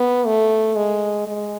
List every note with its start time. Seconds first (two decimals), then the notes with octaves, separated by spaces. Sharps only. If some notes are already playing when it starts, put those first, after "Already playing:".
Already playing: B3
0.26 A3
0.76 G#3
1.27 G#3